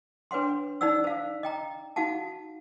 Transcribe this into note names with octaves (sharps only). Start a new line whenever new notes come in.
D4 B4 C#5 F#5 C6
D#4 C5 D5 F#5 E6
C5 F5
D#5 G5 A#5
D#4 F#4 F5 F#5 A5